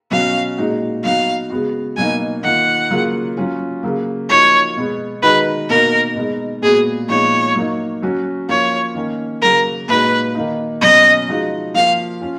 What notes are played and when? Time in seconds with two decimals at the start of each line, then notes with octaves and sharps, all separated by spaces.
0.11 B2 F#3 C#4 F#4 F5
0.58 A#2 G#3 D#4 F#4
1.04 F#3 B3 D#4 F#4 F5
1.50 C#3 G#3 B3 F#4
1.97 B2 F#3 A#3 D#4 G#5
2.43 D#3 A#3 F4 F#5
2.90 C#3 F#3 A#3 F4
3.37 F#3 C#4 F4
3.83 C#3 F#3 A#3
4.29 F3 A#3 D#4 F#4 C#5
4.77 B2 G#3 B3
5.22 D#3 G#3 D#4 F#4 B4
5.69 B2 A#3 D#4 F#4 A#4
6.15 B2 G#3 D#4
6.62 A#2 G#3 B3 F#4 G#4
7.08 A#2 F3 G#3 B3 D#4 C#5
7.55 F#3 A#3 D#4
8.02 F#3 C#4 F#4
8.48 F3 A#3 F4 C#5
8.95 D#3 A#3 C#4
9.42 C#3 F#3 A#3 A#4
9.88 A#2 G#3 D#4 F#4 B4
10.35 D#3 A#3 D#4
10.81 B2 F#3 C#4 D#5
11.28 F3 G#3 D#4 F#4
11.74 F3 A#3 F4 F5
12.21 C#4 F4